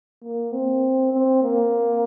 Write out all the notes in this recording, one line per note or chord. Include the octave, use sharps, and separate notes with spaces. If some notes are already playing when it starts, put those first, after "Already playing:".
A#3
C4
C4
A#3